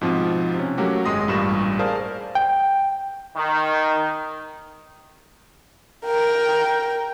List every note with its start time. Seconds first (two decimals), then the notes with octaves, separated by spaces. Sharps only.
0.01 G#2 B2 F3 C4
0.55 C3 C#4
0.78 F#3 A3 A#3 C#4 F#4 G4
1.05 G#1 F#2 G#3 C6 D#6 A#6
1.28 A1 G2 A#2 G3 C#6 E7
1.79 G#4 A#4 C5 D5 F5 A5
2.35 G5
3.36 D#3
6.05 A#4 G5